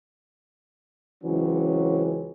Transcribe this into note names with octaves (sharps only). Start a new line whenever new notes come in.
C#2 E3 F#3 C4 C#4